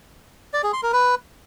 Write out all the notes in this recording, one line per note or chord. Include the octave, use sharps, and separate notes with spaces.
D5
G#4
C6
A#4
B4